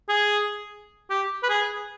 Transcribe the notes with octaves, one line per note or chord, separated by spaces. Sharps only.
G#4
G4
B4
G#4